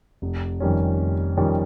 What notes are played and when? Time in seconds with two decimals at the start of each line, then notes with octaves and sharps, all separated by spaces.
0.22 F1
0.60 F2 D#3 G3 C#4
0.99 F1
1.37 F2 D#3 G3 C#4